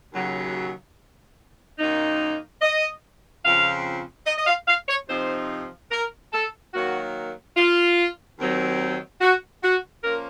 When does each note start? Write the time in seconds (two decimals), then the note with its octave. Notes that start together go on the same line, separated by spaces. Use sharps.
0.13 D#2 C#3 F#3
1.79 F#2 D#3 A#3 D#4
2.61 D#5
3.44 F2 C#3 F3 C4 F5
4.26 D#5
4.38 D#5
4.47 F5
4.68 F5
4.88 C#5
5.09 C3 F3 C4 D#4 C5
5.91 A#4
6.33 A4
6.73 D#3 F#3 A#3 F#4
7.56 F4
8.39 D#2 D#3 F#3 C4
9.21 F#4
9.63 F#4
10.04 F3 A#3 C#4 A#4